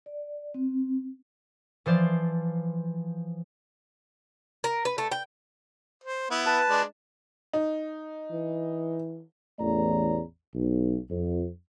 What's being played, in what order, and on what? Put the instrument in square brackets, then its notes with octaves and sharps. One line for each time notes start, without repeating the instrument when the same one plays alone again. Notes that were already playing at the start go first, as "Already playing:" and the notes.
[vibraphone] D5
C4
[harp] E3 F3 C5 D5
[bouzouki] A#4
B4
A3
G5
[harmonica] C5
B3 E4
[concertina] B4 A5
[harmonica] G#3 D4
[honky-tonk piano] D#4
[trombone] E3
[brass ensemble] A1 E2 A3 C#5 D5 A#5
B1
F2